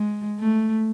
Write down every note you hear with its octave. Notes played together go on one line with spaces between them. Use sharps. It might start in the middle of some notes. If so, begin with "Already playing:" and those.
Already playing: G#3
A3